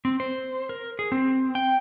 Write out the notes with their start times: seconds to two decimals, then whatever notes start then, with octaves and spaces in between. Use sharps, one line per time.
0.05 C4
0.20 C5
0.69 A#4
0.99 G#4
1.12 C4
1.55 G5